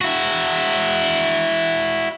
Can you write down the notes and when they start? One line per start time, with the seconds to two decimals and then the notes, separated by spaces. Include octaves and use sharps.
0.01 E4 F#4